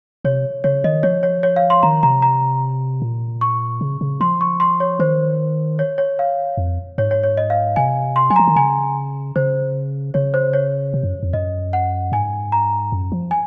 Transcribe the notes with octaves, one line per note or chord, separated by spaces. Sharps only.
C3 C#5
C#3 C#5
D#3 D#5
F3 C#5
C#5
C#5
F5
C6
D#3 A#5
C3 A#5
A#5
A#2
C#6
C#3
C#3
F3 C6
C#6
C6
C#5
D#3 C5
C#5
C#5
F5
F2
G#2 C#5
C#5
C#5
D#5
F5
C3 G#5
C6
F#3 G#5
A#5
F3
D#3
C#3 G#5
C#3 C5
C#3 C#5
C5
C#5
C3
F#2
F2
F#2 D#5
F#5
G#2 G#5
A#5
F#2
F3
G#5